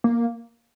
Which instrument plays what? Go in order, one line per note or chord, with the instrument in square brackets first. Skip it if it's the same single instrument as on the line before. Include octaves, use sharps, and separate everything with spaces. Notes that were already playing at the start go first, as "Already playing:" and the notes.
[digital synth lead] A#3